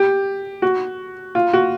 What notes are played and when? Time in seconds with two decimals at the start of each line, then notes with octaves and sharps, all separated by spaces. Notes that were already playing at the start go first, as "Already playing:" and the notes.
Already playing: G4
0.62 F#4
1.35 F4
1.53 F#4